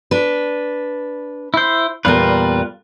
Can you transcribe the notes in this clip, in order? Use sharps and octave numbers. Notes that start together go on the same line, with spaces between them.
D4 B4
E4 C5
E2 A#2 G3 F4 A#4 B4